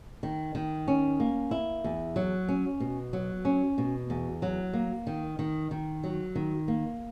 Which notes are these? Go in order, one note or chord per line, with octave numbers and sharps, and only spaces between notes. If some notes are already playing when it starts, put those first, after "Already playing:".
D#3
D#3
C#4
A#3
E4
E2
F#3
C#4
B2
F#3
C#4
B2
E2
F#3
A#3
D#3
D#3
D#3
F#3
D#3
A#3